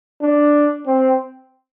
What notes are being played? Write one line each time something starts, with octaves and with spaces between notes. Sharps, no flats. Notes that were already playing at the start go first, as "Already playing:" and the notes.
D4
C4